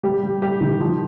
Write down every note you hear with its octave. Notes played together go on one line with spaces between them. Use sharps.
G3 G4
G3
G3 G4
D#3
F3